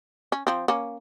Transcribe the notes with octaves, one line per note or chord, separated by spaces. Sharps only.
C#4
F3 C4
A#3 C#4